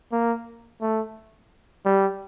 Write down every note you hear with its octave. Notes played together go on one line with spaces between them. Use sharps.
A#3
A3
G3